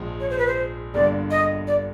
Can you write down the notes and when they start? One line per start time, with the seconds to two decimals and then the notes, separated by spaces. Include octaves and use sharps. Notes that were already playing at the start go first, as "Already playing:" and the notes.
Already playing: A#1 G#2 F3 G#3
0.20 C#5
0.30 C5
0.38 B4
0.47 C5
0.94 G1 G2 D3 G3 A#3 D5
1.31 D#5
1.67 D5